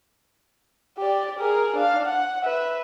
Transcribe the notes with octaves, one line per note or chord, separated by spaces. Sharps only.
G4 D5
G#4 A#4
D4 F5
F#5
B4 E5